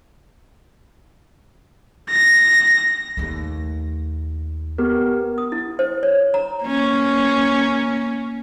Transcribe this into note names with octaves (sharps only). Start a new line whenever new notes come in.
A#6
D#2 A3
B3 G4 A#4
D#6
E4
C5
C#5
A#5
A#3 C#4